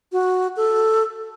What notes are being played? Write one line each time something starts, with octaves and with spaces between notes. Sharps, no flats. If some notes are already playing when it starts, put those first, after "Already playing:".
F#4
A4